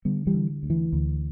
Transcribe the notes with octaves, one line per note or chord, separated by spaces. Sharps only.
D3 G3 B3
E3 G3
D3
D2
E3
D2